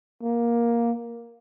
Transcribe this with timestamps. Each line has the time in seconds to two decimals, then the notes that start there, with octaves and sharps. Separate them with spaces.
0.22 A#3